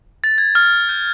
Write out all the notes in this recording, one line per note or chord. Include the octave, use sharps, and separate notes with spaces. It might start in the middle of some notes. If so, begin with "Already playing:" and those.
A6
G#6
F6
G6